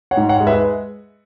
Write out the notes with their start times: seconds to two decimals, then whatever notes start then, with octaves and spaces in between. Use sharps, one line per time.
0.11 C#5 F#5
0.17 G#2
0.29 C#5 F#5
0.40 G#3
0.47 B4 E5